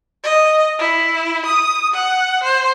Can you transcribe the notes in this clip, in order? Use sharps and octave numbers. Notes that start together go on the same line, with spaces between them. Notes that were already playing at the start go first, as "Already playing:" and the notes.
D#5
E4
D#6
F#5
C5